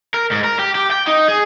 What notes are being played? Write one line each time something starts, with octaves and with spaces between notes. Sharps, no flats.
A#4
G#2
A#4
G4
G4
G5
D#4
G#4